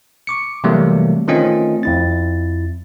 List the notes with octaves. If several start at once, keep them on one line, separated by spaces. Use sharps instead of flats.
C#6 D6 C#7
C3 E3 F#3 G3 A3 A#3
D#3 A3 C4 C#4 F4 D#5
F2 E4 A6